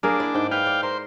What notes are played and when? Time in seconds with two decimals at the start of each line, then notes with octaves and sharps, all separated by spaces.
0.03 A#3 D4 G#4 A#4
0.19 E4 D5
0.34 G#2 G5
0.51 B4 F5 G5
0.66 D5
0.83 A#4 C5